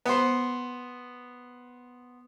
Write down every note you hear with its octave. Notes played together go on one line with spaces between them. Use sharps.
B3 C5